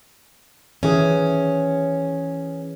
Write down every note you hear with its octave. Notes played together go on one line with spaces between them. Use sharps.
E3 C#4 G#4